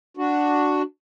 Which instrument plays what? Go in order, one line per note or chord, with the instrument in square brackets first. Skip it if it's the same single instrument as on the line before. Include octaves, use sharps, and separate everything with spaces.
[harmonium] D4 F#4